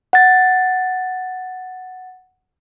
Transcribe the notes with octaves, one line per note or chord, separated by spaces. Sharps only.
F#5 A6